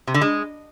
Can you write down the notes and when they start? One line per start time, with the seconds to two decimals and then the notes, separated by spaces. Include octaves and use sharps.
0.07 C3
0.14 D3
0.21 G#3